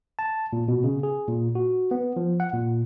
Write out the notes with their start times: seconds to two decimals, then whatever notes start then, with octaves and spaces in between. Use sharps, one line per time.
0.19 A5
0.53 A#2
0.68 B2
0.84 C#3
1.03 G#4
1.28 A#2
1.55 F#4
1.91 B3
2.16 F3
2.40 F#5
2.53 A#2